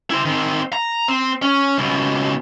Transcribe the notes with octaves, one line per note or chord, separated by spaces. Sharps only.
E4 C5
D#3 C4
A#5
C4
C#4
C#2 B2